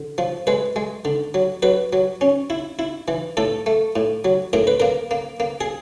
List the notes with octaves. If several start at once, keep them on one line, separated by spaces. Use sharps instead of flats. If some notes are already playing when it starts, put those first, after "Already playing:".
Already playing: D3
F3
G#3 B4
G#3
D3
F#3
F#3 B4
F#3
C#4
E4
E4
E3
A2 A4
A3
A2
F#3
A2 A#4
B4
A#3 A#4
A#3
A#3
G#4